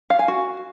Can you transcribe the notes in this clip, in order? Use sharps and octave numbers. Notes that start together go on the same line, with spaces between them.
F5
G#5
F#4